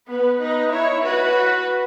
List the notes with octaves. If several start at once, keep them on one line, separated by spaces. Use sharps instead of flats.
B3 B4
D#4 B4
E4 C#5
F#4 B4